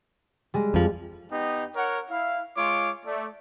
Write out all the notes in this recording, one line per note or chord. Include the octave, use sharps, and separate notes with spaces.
G3 G#3
F2 F3
B3 D#4 G4 D#5
A#4 C#5 F#5
E4 F5
G#3 F4 C#5 D6
A3 D5